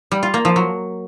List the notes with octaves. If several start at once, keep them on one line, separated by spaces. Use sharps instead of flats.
G3
F4
A#3
F3
F#3